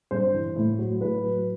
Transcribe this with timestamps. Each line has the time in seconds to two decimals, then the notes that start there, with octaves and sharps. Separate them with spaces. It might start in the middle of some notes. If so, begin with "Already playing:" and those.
0.11 G2 C5
0.33 E3
0.56 A2
0.79 F#3
1.01 A2 B4
1.23 F#3